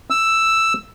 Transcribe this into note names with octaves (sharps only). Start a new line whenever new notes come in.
E6